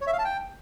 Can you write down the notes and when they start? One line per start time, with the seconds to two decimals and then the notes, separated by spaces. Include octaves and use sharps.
0.01 C#5
0.07 E5
0.13 F5
0.19 A5
0.25 G5